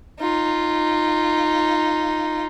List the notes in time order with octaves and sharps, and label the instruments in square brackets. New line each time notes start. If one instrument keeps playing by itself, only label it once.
[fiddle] D#4 F4